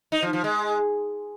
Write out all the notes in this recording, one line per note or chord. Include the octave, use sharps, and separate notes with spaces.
D#4
F3
F3
G#3